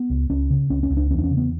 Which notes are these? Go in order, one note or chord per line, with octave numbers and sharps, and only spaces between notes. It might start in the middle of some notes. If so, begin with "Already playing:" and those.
Already playing: B3
C#2
C#2 C#4
C#3
C#2 C#4
C#4
C#2
D4
E2 C#4
D4
C#4
C#3
B3